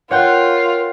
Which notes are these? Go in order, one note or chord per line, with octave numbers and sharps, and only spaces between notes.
F4 A#4 C#5 F#5 G5